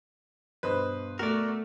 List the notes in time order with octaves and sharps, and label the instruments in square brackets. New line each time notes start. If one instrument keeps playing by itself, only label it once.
[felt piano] G2 B2 D4 [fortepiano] B4 C5 D#5
[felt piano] B2 [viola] A3 [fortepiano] F#4 [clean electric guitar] A#4 D5